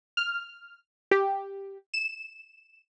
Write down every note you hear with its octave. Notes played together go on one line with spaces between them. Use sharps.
F6
G4
E7